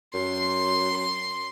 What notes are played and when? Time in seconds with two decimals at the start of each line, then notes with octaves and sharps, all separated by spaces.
0.14 F#2 C6